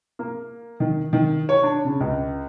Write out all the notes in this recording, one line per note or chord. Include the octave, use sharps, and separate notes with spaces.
A#3
D#3
D#3
C#5
D4
C#3
C#2